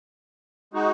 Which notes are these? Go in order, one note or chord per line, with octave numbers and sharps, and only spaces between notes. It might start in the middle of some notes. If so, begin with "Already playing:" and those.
G#3 D#4 F#4